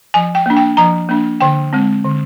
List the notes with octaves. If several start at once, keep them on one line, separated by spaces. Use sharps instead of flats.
F3 G#5
G5
A#3 D4
G5
F3 A#5
A#3 D4
D3 G5
G#3 C4
D3